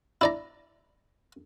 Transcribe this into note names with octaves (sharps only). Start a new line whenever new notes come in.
E4 D5 A#5